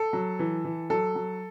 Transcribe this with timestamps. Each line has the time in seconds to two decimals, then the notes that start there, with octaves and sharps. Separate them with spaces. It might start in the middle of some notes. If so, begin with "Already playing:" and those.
Already playing: A4
0.13 F#3
0.39 E3
0.65 E3
0.90 F#3 A4
1.15 F#3